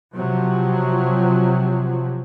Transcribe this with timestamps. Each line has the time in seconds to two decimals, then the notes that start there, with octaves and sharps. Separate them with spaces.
0.15 C3 F3 F#3